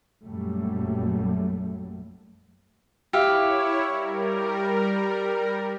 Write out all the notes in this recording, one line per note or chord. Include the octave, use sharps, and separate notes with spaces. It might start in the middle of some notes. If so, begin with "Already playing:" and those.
A#1 F#2 A#2 F#3 G3 A3
E4 G4 C#5 E5 F5
G3 A#4